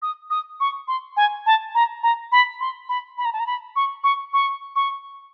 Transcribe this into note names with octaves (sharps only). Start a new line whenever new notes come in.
D#6
D#6
C#6
C6
G#5
A5
A#5
A#5
B5
C6
B5
B5
A#5
A5
A#5
B5
C#6
C#6
C#6
C#6